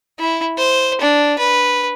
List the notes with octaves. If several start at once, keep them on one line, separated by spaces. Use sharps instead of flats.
E4
C5
D4
B4